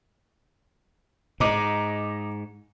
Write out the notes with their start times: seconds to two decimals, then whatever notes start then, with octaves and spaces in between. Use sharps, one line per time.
1.40 G#2 D#5 A#5 D6